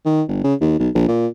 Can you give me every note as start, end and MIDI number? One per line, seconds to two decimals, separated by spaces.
0.05 0.22 51
0.28 0.39 31
0.44 0.54 49
0.61 0.75 39
0.79 0.89 35
0.95 1.04 34
1.08 1.27 46